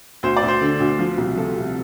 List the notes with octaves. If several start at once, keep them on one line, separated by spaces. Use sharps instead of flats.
D2 C5
D5
D2
C5
D3
D2
F3
C2
F3 A4
C3